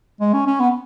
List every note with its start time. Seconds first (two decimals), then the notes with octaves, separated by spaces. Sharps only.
0.21 G#3
0.33 C#4
0.47 C#4
0.60 B3